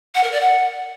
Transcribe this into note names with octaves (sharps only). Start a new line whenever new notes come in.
F#5
A#4
D5
F#5